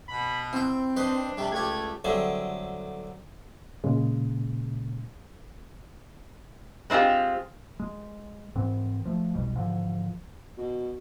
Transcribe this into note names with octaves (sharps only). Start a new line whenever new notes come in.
B2 B5
C4 E4 G5
D4 B4 C5 D#5
C3 G3
C#2 A3 G4 G#6
D3 F#3 G3 A3 C4 G#4
A#2 C#3 G#3
G#3 C4 D#4 F4 G4
G#3
G#2 E3 C4
F3 A3
F1 B1 B2 G3
G#2 D3 E3 F3
B2